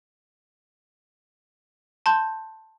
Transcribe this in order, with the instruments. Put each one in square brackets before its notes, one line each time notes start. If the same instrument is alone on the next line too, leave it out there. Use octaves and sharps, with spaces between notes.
[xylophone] A5 C6 G6